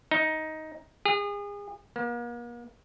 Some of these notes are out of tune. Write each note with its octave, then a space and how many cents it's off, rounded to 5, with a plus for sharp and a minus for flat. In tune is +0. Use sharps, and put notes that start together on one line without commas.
D#4 +10
G#4 -35
A#3 +40